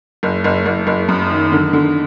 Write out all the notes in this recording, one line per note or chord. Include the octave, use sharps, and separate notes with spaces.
F#1
F#1
F#1
F#1
F#2
D#3
D3
D3